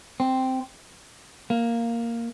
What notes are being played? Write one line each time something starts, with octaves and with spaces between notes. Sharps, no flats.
C4
A#3